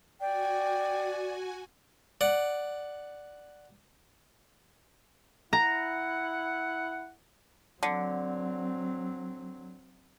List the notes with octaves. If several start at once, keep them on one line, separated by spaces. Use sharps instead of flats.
F#4 D5 G5 G#5
D5 F#5
E4 F#5 A#5
D3 F#3 C4